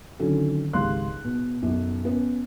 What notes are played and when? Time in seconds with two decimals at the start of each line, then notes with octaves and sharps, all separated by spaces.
0.19 D3 D#3 F#3 C#4 F#4 A4
0.73 G#1 C#2 G4 F5 C6 F#6
1.24 B2
1.62 B1 F#2
2.05 B3 C#4